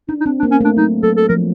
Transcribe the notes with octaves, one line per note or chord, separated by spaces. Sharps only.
D4 D#4
D#4
C4 D4
D4
A#3
C#4
A3 D4
F#3 D#4
F#3 A4
A4
F3 A#4